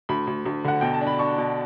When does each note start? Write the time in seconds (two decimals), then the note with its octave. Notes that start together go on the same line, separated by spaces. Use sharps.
0.09 D2 B5
0.27 D2
0.46 D2
0.64 D3 F#5
0.81 B2 G5
0.94 A5
1.01 D4
1.07 B5
1.19 D4 C#6
1.38 B2